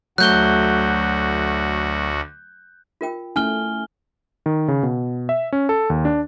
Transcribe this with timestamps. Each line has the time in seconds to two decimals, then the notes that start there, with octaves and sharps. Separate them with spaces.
0.18 D2 F#3 A3 F#4 F#6 G6 G7
3.01 F4 A#4 G5
3.36 A3 C#4 E4 G#5 F6 G7
4.46 D#3
4.68 C#3
4.83 B2
5.29 E5
5.52 C#4
5.69 A4
5.90 D#2
6.05 D4